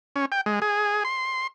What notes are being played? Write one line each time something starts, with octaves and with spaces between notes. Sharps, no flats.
C#4
G5
G#3
G#4
C6